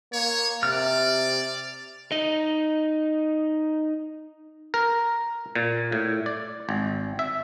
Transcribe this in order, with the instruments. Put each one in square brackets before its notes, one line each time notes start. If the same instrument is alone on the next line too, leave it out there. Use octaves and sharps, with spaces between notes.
[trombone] A#3 [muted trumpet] C#5
[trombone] C3 [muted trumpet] D5 [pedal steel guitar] F6
[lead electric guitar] D#4 D#5
[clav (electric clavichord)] A#4
A#2
A2
D5
G#1
E5